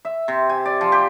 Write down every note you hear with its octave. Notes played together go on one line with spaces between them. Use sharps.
E5
C3
G#5
D5
F3
G4